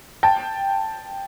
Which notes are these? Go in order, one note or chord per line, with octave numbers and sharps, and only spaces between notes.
G5 A5